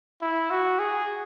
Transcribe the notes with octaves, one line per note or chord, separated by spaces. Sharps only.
E4
F#4
G#4